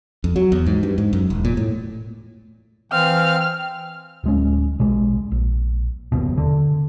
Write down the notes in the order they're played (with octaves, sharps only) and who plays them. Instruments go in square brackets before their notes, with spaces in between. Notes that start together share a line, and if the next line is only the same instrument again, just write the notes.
[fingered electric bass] F2
F#3
E2
G#2
G2
G#2
F#2
E1
A#2
A2
[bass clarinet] E3 [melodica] C4 F5 [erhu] F6
[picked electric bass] D1 G#3 C#4
A#1 B2 G#3
A#1
F#1 D#2 B2
D3